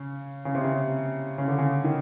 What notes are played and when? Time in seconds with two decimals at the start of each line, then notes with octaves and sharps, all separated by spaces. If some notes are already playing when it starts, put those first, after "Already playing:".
Already playing: C#3
0.45 C#3
0.55 C3
0.64 C#3
1.38 C#3
1.48 D3
1.58 C#3
1.84 D#3